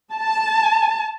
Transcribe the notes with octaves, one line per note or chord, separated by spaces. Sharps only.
A5